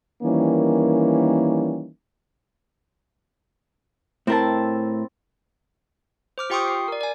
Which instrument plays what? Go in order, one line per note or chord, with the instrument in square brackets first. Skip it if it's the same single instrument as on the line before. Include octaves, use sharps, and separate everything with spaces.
[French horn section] D#3 E3 G3 A#3 C#4
[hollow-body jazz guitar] A2 A#4 [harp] C4 E4 A5
[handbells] C5 D6 F6
F4 G4 G5 C6 C#6 D#6
C7
A#4 D5
D5 G#5